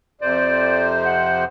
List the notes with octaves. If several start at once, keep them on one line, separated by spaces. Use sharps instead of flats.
F2 C3 C5 D5
F#5